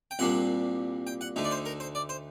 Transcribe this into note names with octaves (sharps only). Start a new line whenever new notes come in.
G5
C2 A#2 G3 D4 F#5
G5
F#5
D2 D3 A3 D#4
D5
C5
A#4
C5
D5
C5